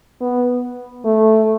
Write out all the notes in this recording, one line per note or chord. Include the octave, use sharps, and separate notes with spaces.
B3
A3